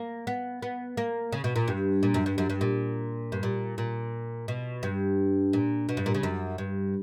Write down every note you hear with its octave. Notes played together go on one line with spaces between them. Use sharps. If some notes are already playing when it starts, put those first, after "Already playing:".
Already playing: A#3
B3
B3
A#3
C#3
B2
A#2
G2
A#2
F#2
G2
F#2
G2
A#2
G2
A#2
A#2
B2
G2
A#2
B2
G2
A#2
C#3
F#2
G2